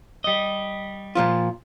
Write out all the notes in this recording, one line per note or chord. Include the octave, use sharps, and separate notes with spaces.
G3 D#5
A#2 F3 F4